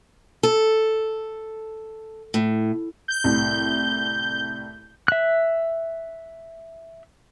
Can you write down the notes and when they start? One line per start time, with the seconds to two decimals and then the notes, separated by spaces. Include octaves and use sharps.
0.43 A4
2.34 A2
3.08 G6
3.24 C2 A2
5.08 E5 F#6